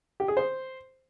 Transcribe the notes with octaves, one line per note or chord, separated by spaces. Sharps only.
G4
G#4
C5